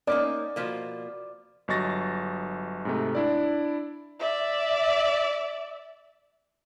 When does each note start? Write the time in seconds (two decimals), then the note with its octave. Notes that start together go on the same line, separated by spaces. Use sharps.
0.07 A#3 C#4 D#4 D5 D6
0.56 B2 F3 A#3
1.68 G1 F#3 D#5 C#6 A6 A#6
2.85 G#2 C3 A3
3.15 D4 E4 D5
4.19 D5 E5